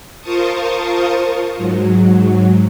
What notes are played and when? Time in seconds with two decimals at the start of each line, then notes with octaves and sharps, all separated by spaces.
0.21 F4 A#4 C5 A5 C#6 D#6
1.57 G#2 F#3